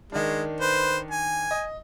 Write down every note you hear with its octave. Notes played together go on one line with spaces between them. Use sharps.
D#3 G#3 D4
B4 C5
G#5
D#5